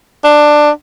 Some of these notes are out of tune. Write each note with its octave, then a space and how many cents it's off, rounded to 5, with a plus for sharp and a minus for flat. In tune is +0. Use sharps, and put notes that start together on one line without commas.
D4 +15